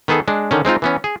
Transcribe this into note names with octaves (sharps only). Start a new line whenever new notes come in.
D#3 B3 G#4 A4
G#3 D4
D3 D#3 C#4
G#3 C4 D#4 F4
E3 B3 C#4
G#4